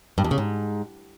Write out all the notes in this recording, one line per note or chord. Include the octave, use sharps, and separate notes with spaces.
G2
E2
C#3
G#2